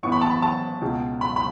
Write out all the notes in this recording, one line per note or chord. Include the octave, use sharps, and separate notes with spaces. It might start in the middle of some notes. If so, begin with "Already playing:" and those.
A1 A2 E3 B3 C#6
B5
A5
B5
A5
C#2 B2 G#3
B5
B5